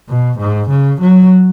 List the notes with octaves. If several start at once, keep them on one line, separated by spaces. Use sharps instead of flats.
B2
G#2
C#3
F#3